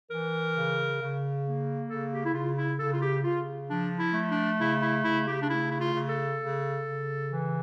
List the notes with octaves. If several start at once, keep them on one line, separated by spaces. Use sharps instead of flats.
E3 A#4
C#3
C#3
A#3
C#3 A4
G4
E4
C#3 F4
E4
C#3 A4
F4
G4
C#3 F4
F3 D4
E4
A3
D4
C#3 E4
E4
C#3 E4
G4
D4
A3 E4
E4
F4
C#3
A4
C#3
C#3
E3